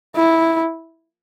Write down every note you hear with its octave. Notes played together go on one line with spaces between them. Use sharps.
E4